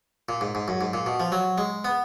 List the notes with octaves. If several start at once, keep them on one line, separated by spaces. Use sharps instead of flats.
A#2
G#2
G#2
F#2
G#2
A#2
B2
F3
F#3
G#3
B3